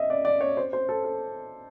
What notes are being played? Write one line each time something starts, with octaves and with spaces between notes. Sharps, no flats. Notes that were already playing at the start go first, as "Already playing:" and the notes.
Already playing: D#5 E5
D5
D5
C#5
C5
C5
A4
A4